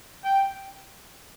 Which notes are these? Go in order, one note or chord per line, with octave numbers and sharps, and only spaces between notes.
G5